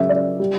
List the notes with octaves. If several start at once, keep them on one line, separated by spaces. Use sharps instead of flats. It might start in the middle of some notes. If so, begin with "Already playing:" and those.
Already playing: C#3 F#3 E5
D5
G3